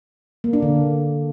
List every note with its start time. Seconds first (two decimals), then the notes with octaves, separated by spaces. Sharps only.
0.44 A#3
0.53 D4
0.62 D3